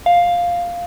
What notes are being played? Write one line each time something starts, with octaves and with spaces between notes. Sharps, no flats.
F5